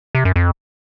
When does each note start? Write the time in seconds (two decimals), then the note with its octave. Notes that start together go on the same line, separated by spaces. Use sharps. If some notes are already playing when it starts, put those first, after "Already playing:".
0.15 C3
0.25 F#2
0.36 F2